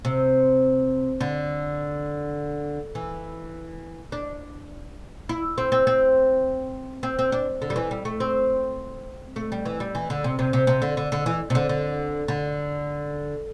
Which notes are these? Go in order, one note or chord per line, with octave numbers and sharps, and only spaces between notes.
C3
D3
E3
D4
E4
C4
C4
C4
C4
C4
D4
D3
G3
E3
G3
A3
C4
A3
G3
E3
G3
E3
D3
C3
C3
C3
C3
D3
D3
D3
E3
C3
D3
D3
D3